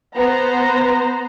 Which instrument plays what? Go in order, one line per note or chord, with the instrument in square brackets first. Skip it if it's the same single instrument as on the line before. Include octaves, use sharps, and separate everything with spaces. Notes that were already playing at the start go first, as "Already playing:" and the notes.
[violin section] B3 C5 A#5